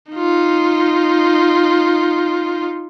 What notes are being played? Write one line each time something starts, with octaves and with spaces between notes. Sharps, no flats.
D#4 F4